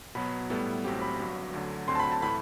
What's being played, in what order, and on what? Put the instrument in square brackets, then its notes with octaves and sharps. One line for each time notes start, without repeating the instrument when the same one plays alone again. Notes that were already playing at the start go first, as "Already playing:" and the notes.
[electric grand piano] B2 F#3 B3 [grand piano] B5
[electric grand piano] A2 G3 B3 E4 A4
A1 A2 F#3 C4 G4
[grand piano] B5
[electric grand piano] G1 G2 F#3
D2 D3 F#3
[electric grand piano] D2 D3 F#3 C4 [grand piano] C6
[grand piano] A5
B5
A5
[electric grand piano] A2 E3 A3 [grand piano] B5